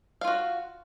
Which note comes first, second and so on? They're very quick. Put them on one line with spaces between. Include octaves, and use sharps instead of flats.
F5 F4 F#4